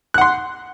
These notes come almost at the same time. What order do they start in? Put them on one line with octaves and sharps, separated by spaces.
F#6 F#5 C6